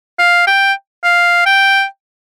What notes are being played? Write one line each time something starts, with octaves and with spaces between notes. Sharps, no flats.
F5
G5
F5
G5